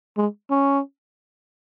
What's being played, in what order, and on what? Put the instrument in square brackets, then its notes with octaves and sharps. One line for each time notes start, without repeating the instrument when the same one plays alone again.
[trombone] G#3
C#4